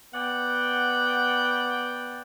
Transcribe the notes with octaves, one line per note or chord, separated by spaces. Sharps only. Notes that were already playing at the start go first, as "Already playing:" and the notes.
B3 D5 F#5 G5